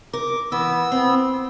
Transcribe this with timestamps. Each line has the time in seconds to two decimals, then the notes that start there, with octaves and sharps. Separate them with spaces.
0.13 A#4 D6
0.52 E3 B3 E6
0.92 C4